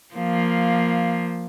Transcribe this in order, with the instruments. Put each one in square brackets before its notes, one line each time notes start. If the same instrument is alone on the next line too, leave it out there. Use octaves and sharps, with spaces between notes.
[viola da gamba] F3 A#3